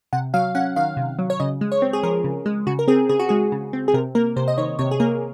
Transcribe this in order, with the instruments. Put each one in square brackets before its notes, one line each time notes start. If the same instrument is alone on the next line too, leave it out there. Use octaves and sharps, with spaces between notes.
[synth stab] C3 F#5
F#3 F5
C#4 F#5
D#3 F5
C3
F#3
C#5
C#3 D#5
G#3
C#5
C4
G#4
F3 A#4
C#3
G#3
C#3 F#4
A#4
C4 G#4
C#3 G#4
F#4
G#3 G#4
C#3
C4
G#4
C3 A#4
A#3 A#4
C3 C5
D#5
D#3 C#5
C3 C#5
G#4
A#3 A#4